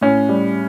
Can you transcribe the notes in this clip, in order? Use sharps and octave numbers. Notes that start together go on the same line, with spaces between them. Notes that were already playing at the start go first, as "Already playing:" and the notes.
A2 C#4
G3